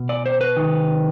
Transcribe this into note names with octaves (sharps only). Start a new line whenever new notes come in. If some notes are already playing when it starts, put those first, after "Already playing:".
Already playing: B2
D5
C5
B4
C3 D#3